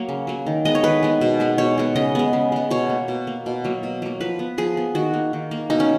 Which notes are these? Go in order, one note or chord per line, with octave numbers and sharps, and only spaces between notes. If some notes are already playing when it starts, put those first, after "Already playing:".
Already playing: F#3 A#3 C#5
C#3
F#3 A#3
D#3
G#3 B3 D#5
C#5
D#3 B4
G#3 B3
B2
G#3 B3
B2 C#5
G#3 B3
C#3 D#5
G#3 B3
C#3
G#3 B3
B2 C#5
A#3
B2
A#3
B2
F#3 A#3
B2
F#3 A#3
F3 B4
B3
F3 G#4
B3
D#3 F#4
A#3
D#3
A#3
B2 D#4
C#4